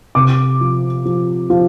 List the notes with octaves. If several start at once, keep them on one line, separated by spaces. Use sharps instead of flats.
C3 D6
F3
F3
F3